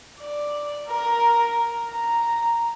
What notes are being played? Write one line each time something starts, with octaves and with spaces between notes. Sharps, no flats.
D5
A#4
A#5